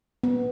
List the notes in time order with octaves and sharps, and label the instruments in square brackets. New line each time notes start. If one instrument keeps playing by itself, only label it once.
[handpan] B3